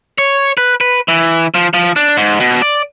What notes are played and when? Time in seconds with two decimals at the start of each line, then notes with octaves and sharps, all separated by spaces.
0.18 C#5
0.57 B4
0.81 B4
1.08 E3
1.54 F3
1.74 F3
1.96 D4
2.17 G#2
2.40 B2
2.62 D5